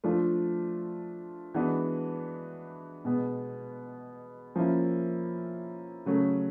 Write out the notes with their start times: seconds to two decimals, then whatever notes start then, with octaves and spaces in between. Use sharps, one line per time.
0.04 F3 A3 D4 F4
1.54 E3 G#3 B3 D4 F#4
3.05 B2 G#3 B3
4.56 F3 A#3 C#4 E4
6.06 C#3 F#3 A3